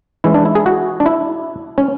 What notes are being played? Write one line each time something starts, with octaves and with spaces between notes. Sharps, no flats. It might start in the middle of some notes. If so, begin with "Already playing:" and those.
E3 G#3 C#4 E4
D4
E4
G#4
F#4
D4
E4
C#4